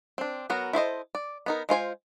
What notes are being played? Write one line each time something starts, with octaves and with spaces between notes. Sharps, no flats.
C4 D4
F#3 B3 F#4 A#4
E4 A4 C5 D#5
D5
B3 D#4 A#4
G#3 F4 C5 G#5